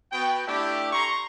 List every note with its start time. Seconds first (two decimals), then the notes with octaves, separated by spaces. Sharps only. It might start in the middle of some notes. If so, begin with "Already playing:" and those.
0.12 B3 F#4 G5
0.47 A3 D4 E4 G4
0.93 A#5 C6 C#6